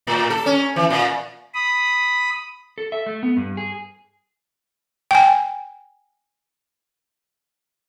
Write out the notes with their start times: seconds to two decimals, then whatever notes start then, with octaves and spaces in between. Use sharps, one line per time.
0.07 A2
0.30 A4
0.46 C#4
0.76 E3
0.90 A#2
1.55 B5 D#6
2.78 A4
2.92 E5
3.06 A3
3.23 B3
3.37 G2
3.57 G#4
5.11 G5 G#5